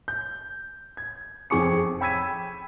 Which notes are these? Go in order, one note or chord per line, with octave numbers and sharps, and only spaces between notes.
G6
G#6
F2 C4 G#4 C#6 D6 C#7
G5 B5 E6 G#6 B6 D#7